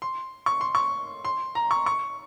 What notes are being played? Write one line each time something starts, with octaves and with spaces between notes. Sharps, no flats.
C6
C#6
C6
C#6
C6
A#5
C#6
C#6